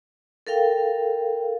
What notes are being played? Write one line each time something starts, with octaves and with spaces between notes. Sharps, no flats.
A4 A#4 F5 G5